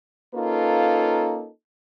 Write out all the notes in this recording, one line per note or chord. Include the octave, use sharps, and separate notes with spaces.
A#3 C#4 D#4 F4 A4 B4